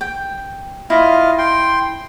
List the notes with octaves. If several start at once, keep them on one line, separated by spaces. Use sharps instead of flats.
G5
E4 F4 D#5 F5
G5 C6